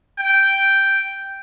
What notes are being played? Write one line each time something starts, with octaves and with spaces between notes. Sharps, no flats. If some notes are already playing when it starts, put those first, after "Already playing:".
G5